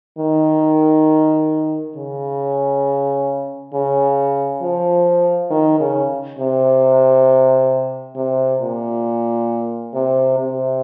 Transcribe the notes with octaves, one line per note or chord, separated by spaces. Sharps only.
D#3
C#3
C#3
F3
D#3
C#3
C3
C3
A#2
C3
C3